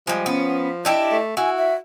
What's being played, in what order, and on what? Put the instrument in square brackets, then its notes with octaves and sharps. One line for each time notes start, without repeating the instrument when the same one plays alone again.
[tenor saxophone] F3 [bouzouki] G3 G#3
[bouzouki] B3 [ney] C#4
[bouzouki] D4 E4 G4 [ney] D#5
[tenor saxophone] A3
[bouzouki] E4 [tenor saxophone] F#4 [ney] G#5
[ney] E5